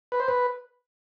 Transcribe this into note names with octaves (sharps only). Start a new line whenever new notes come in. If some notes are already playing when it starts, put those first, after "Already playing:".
B4
C5
B4